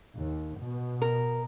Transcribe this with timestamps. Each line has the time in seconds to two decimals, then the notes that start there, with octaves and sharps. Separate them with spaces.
0.17 D#2
0.61 B2
1.02 A#4